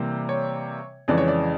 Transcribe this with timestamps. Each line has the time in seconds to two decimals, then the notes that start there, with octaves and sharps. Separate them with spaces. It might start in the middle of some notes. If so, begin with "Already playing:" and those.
Already playing: C3 E3 G3 A#3
0.29 C#5
1.08 F2 C#3 E3 G#3 D5
1.18 C#5
1.28 D5